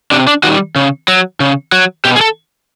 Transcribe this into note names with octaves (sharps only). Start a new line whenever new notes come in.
C3 D4
D4
D#3 G3 F#4
C#3
F#3
C#3
F#3
B2 G4
G#4
A4